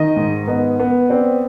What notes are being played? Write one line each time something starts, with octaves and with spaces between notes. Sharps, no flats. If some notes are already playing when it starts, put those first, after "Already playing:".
Already playing: D#3 D#5
G#2
B3 D#5
B3
C4 D5